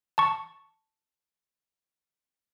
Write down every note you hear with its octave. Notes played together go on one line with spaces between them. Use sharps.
A5 C#6